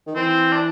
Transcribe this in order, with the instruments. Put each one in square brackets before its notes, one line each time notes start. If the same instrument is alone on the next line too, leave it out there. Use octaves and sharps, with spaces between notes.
[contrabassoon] D#3
[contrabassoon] E3 [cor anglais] C4
[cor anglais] D4